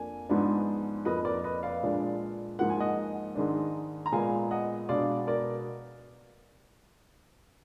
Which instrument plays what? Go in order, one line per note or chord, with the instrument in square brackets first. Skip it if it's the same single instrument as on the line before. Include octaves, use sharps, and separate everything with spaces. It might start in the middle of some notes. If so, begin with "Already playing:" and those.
Already playing: [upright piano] F2 A#3 D4 G#5
G#2 F3 G#3 B3 D4
F2 F3 A#3 B4 D#5
A#4 D5
B4 D#5
D5 F5
A#2 G#3 D4
G#2 F3 A#3 F#5
G#5
D#5 F#5
G#2 D#3 G#3 D4
A#5
A#2 G#3 B3 F5 G#5
D#5 F#5
B2 G#3 B3 D4 D5 F5
A#4 D5